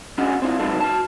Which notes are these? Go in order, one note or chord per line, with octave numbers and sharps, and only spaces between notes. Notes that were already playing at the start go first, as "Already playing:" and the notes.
C#4 D4 F#4 G#4 D#5 F#5
C4 E4 F4
C3 F#3 G#3 B3 D#4 A4
F#4 A5